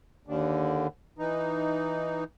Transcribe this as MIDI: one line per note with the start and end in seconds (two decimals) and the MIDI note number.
0.27 0.87 39
0.27 0.87 50
1.19 2.24 52
1.19 2.24 63